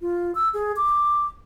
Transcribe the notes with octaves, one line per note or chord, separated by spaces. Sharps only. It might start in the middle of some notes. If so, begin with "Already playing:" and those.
F4
E6
G#4
D6